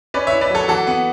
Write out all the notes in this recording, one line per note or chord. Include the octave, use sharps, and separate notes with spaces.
C#4 B4 D5
C#5 E5
E4
B4 D5
F#3 A4 C#5
E3 F#4 A4
B3